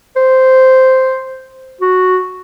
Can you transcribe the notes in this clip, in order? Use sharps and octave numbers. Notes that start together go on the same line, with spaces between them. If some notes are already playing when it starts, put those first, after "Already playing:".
C5
F#4